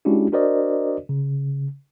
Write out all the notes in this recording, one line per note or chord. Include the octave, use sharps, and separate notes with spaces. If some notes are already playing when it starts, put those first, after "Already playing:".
G#3 C#4 D4 E4 F#4 G4
D4 F#4 A#4 C5 D5 D#5
C#3